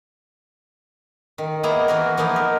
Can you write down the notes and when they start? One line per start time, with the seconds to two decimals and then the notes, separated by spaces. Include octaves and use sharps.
1.38 D#3
1.63 A#3 B3 E4 G#4 A#5
1.88 E3 F#4 A#4
2.17 F3 A#3 B3 D#4 E4
2.36 A#4